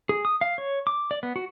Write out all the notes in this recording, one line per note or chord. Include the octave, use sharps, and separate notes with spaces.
G#4
D#6
F5
C#5
D6
D5
B3
F#4